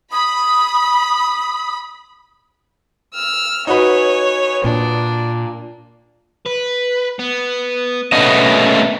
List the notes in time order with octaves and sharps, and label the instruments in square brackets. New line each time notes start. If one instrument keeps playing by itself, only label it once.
[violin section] B5 [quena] D#6
[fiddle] E6 F6
[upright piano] D#4 F#4 B4 [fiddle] C#5 G#5
[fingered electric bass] A#2 [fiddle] D4
[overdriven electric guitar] B4
B3
[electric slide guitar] A3 B3 D#5 [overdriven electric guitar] C#4 D4